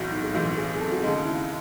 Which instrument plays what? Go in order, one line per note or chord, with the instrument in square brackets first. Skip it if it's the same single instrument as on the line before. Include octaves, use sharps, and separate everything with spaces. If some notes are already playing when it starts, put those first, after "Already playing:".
Already playing: [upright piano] B1 A2 E3 G#3 [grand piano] F#4
[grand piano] D#4
G#4
[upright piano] B1 A2 E3 G#3 [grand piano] F#4
[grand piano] G#4
G#4
A4
F#4
[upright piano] D#2 C#3 G#3 D#4 [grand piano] G#4
[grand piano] E4